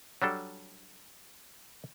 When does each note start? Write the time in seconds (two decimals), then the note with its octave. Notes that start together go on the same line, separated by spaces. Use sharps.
0.22 F#3 G3 D4 A4